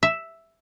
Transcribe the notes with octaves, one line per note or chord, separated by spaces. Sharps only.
E5